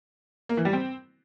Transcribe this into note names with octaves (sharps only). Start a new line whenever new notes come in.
A#3
E3
G3
C4